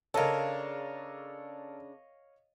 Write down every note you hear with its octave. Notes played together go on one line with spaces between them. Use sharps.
C#3 D4 A4 A#4 C#5 D#5 F5